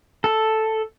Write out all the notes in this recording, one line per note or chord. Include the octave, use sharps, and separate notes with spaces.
A4